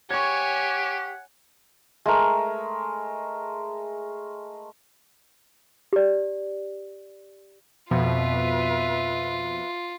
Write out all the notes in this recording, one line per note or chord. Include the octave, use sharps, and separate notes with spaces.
G4 C#5 F#5 G#5 C#6 G#6
G#3 A3 A#4
G4 D5
F2 B2 F3 F4 B4 E5